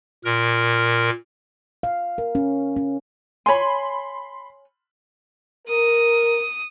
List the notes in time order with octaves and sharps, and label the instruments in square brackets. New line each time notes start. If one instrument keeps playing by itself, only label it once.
[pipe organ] A#2 A#4
[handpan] F5
A#4
C#4
C#4
[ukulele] C#5 G#5 [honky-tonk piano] B5 C6
[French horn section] A#4 [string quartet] D#6